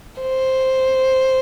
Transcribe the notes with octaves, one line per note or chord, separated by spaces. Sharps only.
C5